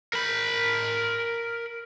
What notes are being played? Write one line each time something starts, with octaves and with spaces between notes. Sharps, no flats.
A#4 B5